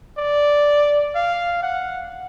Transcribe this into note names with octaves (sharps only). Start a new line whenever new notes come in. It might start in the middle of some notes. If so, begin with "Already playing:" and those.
D5
F5
F#5